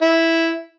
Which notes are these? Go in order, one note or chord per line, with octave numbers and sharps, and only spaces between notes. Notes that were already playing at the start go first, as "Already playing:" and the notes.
E4